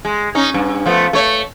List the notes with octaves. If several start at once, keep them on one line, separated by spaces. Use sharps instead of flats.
G#3
C#4 D#4
G2
F3 A3 B3
A3 C#5